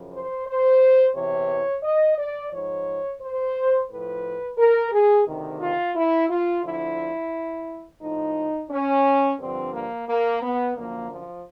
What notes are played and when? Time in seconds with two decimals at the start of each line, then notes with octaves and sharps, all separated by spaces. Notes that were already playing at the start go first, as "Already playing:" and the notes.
Already playing: F#2 C#3 F3
0.12 C5
0.47 C5
1.15 E2 C3 E3 C#5
1.83 D#5
2.18 D5
2.52 G#2 F3 C#5
3.21 C5
3.90 A2 F3 B4
4.58 A#4
4.92 G#4
5.27 D2 C3 D#3
5.61 F4
5.96 E4
6.30 F4
6.64 D2 D3 F3 E4
8.02 A2 F3 D#4
8.71 C#4
9.39 G2 D3 F3 C4
9.74 A#3
10.08 A#3
10.42 B3
10.76 F#2 D3 F3 A#3
11.11 F3